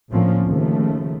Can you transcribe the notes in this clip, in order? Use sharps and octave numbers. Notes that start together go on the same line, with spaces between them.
A2 D3 F3 A#3 C4 C#4
D#2 C#3 F3 A3